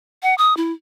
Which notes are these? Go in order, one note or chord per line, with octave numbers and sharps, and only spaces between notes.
F#5
D#6
E4